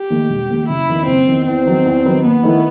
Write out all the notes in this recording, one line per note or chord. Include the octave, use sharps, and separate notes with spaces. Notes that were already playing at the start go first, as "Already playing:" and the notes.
Already playing: G4
D#2 D#3 A3
E1
D#2 D#3 A3
F#1 E4
E2 D#3
F#1 C4
E2 D#3
E2 C4
D#3 F#3 B3
E2
D#3 F#3 B3
D#2 B3
D#3 A3 E4 B4